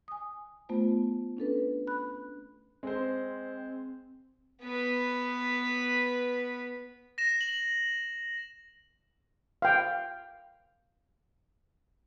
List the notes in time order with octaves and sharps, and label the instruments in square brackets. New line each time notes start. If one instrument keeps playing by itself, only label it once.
[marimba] G#5 D#6
A3 B3 F4 C5
C#4 D4 A4 B4
B5 F#6
[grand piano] G#3 C5 [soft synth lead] C4
[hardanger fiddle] B3 B4
[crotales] A#6 E7
F#7
[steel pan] F5 G5